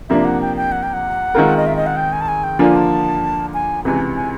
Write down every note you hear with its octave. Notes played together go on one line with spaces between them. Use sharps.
C3 F3 A#3 D4 E5
F#5
G5
G5
F#5
G5
F#5
D#3 G#3 C4 F4 A#4
D#5
E5
D#5
F#5
G5
G#5
A5
G#5
G5
D3 F3 A#3 D4 F4 G#5
A5
G#5
C#2 C3 E3 G#5
G#5